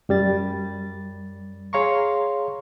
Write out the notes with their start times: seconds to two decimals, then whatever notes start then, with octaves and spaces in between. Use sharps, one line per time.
0.09 F#2 G3 A6
1.73 G#4 C#5 F5 A#5 C6 C#6